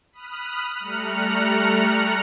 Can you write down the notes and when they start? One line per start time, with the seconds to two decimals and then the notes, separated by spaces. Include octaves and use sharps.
0.12 B5 D#6 F6 F#6
0.80 G3 A3 A#5 F6 F#6 C#7